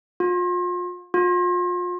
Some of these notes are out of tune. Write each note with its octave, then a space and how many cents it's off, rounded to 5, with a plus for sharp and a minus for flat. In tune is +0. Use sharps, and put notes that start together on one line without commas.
F4 +35
F4 +35